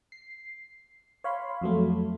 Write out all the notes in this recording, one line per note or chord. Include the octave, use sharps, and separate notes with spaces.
C7
C#5 F5 B5 C6
F2 F#3 A3